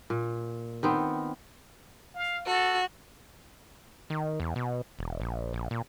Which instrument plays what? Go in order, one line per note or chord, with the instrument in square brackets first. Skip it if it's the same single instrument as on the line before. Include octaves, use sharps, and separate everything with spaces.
[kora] A#2
D#3 B3 C4
[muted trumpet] F5
[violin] F#4 [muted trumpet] A4
[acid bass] D#3
E2
B2
E1
A#1
A#1
A#2